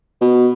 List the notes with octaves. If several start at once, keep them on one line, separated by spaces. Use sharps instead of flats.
B2